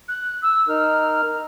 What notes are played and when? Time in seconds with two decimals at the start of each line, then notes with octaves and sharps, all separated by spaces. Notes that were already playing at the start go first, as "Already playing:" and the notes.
0.08 F#6
0.42 E6
0.68 D#4 A#4 F6